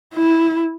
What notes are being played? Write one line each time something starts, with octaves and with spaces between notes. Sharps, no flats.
E4